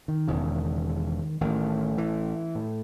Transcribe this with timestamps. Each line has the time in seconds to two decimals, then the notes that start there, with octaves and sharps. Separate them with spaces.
0.08 D#3
0.28 E1 E2 C#3
1.41 A1 A2 D#3
1.98 E3
2.55 A2